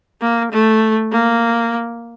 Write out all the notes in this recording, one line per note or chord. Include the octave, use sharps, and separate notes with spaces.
A#3
A3
A#3